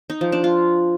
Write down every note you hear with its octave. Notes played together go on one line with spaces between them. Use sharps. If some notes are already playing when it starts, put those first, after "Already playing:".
D#4
F3
D4
F4